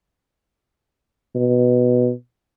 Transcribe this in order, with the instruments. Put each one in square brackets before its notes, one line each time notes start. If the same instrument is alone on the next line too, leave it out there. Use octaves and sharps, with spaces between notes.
[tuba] B2